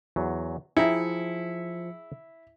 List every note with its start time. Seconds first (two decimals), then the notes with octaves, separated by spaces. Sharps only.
0.16 E2 F#3
0.77 F3 E4 G#4 G5 A#5 C#7